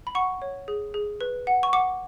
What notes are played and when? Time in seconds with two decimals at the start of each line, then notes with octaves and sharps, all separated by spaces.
0.07 B5
0.15 F#5 C#6
0.42 C#5
0.68 G#4
0.94 G#4
1.21 B4
1.47 F#5
1.63 C#6
1.73 F#5 D6